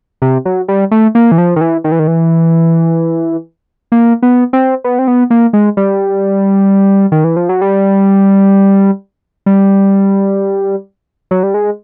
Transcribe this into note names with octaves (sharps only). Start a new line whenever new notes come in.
C3
F#3
G3
A3
A#3
E3
F3
D#3
E3
D#3
E3
D#3
E3
A#3
B3
C4
B3
C4
B3
A#3
G#3
G3
D#3
E3
F3
F#3
G3
G3
F#3
G3
G#3